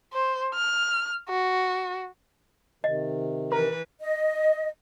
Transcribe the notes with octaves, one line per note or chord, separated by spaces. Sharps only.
C5
F6
F#4
C3 D#3 D#5
E3 A#4 B4
D#5